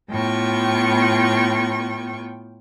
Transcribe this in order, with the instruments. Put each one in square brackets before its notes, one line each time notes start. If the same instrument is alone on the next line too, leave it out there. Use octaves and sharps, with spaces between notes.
[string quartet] A2 B3 F4 G5 C#6